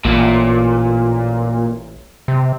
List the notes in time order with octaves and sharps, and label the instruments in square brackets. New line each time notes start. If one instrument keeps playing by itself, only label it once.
[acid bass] A1 [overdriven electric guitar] A#2
[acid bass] C3